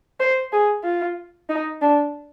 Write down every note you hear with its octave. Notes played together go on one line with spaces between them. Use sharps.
C5
G#4
F4
D#4
D4